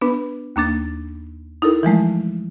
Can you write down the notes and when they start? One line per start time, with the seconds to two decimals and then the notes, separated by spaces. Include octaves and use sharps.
0.01 B3 D4 B4
0.56 D#2 A#3 D4 A6
1.62 D#4 E4 A4 A#4
1.83 E3 F3 G#3 A3